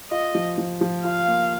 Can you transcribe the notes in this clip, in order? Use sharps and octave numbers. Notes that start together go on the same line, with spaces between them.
F4 D#5
F3
F3
F3
F4 F5
A#3